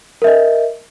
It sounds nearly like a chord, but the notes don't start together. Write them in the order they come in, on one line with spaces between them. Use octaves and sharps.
A#4 E5 D#5